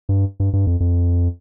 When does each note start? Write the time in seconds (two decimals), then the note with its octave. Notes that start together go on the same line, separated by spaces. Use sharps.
0.09 G2
0.40 G2
0.53 G2
0.67 F2
0.80 F2